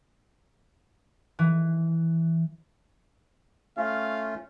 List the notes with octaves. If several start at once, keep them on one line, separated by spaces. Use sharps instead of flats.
E3
A3 C#4 F4 F5